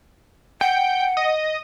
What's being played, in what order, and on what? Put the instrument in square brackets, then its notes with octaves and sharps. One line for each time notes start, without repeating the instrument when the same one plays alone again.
[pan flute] F#5 [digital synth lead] G5
[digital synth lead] D#5